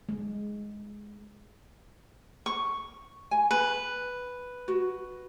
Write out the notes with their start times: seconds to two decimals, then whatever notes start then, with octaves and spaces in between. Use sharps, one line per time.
0.09 G#3
2.46 C#6
3.31 G#5
3.51 B4
4.68 F#4